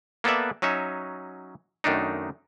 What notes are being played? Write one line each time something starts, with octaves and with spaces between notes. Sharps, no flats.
A#3 B3 A4 B4 D5 E5
F#3 C#4 D#4 E5
F#2 D#3 A3 D4 D#4